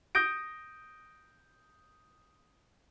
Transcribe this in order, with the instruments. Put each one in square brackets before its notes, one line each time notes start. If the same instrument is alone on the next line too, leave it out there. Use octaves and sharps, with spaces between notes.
[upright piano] D#6 G6 A#6 D7